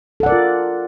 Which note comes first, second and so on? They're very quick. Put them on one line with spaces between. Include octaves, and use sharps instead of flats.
A4 F#5 D5 A#4 F4